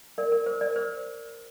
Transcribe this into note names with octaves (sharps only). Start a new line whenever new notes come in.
A#4 D5
A#4
C5
A#4 D5
C5